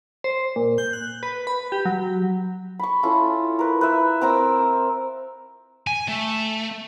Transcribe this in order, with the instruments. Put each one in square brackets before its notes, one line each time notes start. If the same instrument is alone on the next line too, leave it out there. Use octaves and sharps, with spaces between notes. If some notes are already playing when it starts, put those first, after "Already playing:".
[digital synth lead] C5
A#2
G6
F#6
B4
B5
G4
F#3
[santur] B5 C#6
C#4 E4 F4 A4
A#4 B4
B4 E5
C4 A#4 A#5 E6
[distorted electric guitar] G#5
A3